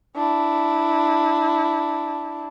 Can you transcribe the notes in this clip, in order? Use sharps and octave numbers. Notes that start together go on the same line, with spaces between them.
D4 E4